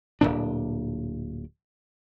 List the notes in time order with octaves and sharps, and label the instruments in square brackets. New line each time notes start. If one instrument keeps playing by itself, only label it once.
[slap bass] D1 B1 A#2 D4